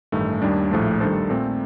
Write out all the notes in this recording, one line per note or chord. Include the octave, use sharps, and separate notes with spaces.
A1 G2 D#3 A3
D#2 D#3 G3 D4
A#1 A2 F3 A3
D#3 G3 D4 A4 C5
A#2 A3 C4